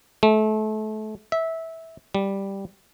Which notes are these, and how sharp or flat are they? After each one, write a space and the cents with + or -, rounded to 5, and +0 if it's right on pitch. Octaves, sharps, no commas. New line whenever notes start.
A3 -30
E5 -15
G3 +0